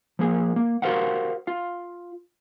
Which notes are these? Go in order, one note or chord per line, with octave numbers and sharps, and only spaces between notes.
F3 A#3 G#4
A#3
F#4 G4 A#4 C5 F5 F#5
F4 F5